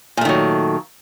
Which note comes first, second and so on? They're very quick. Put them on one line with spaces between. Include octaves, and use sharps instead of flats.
A#2 A3 D#3 F#3